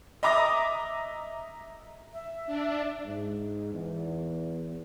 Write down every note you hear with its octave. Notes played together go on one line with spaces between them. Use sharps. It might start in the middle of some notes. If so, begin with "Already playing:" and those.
D#5 E5 A#5 D6 D#6 A#6
E5
D4
G#2
E2